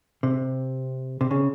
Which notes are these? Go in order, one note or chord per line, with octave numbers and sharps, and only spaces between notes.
C3
C3
C#3